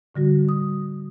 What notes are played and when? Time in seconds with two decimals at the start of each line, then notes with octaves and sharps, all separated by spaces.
0.15 A2 D3 G3 F#4
0.49 D#6